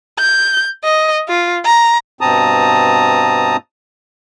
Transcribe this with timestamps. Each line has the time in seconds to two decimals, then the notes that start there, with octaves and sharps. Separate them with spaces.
0.19 G6
0.84 D#5
1.29 F4
1.65 A#5
2.21 G2 B2 C4 A5 A#5 D#6